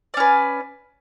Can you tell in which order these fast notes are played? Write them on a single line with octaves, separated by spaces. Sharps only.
D5 C#4 B4